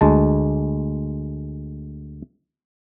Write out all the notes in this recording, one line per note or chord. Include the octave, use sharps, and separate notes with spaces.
D2 G#3 A5